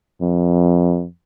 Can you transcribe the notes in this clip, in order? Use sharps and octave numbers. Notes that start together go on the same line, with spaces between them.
F2